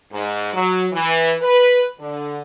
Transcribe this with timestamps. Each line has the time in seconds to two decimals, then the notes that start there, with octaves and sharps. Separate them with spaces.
0.12 G#2
0.53 F#3
0.92 E3
1.41 B4
1.99 D3